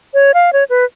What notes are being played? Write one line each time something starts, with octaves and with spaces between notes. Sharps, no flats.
C#5
F5
C#5
B4